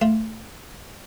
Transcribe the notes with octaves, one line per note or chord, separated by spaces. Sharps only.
A3 F4 A4